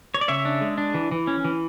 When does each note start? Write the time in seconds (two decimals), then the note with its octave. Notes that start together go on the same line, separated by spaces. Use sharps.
0.14 C#5
0.21 D5
0.28 C#3 C#5 E5
0.45 D4
0.61 G#3
0.78 D4
0.94 E3
1.11 E3
1.27 C#4
1.44 E3